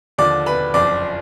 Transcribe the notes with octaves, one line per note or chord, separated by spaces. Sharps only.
D#2 D3 F3 D5 D6
B4 B5
F#1 F2 F3 D5 D6